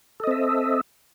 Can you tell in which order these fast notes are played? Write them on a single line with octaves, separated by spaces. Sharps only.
A4 D#5 C4 E5